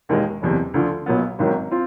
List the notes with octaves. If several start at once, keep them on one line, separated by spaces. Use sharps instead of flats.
E1 D#2 D#3 G#3
F#1 E2 C3
D2 D3 F3
B1 A#2 F#3 B3
G#1 G#2 D#3 F#3
C4 F4